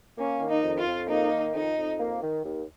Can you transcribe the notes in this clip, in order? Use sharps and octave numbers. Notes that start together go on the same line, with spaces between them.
A#3 C#4
D#3
D#4
F2
F4
F2
A#3 D#4
D#3
F2 D#4
F2
A#3
D#3
D#2